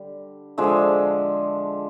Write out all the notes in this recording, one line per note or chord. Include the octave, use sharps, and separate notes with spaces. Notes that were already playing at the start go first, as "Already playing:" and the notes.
Already playing: D3 G3
D3 F3 G#3 D5 E5